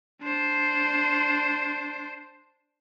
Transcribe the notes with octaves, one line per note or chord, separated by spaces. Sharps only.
D4 C5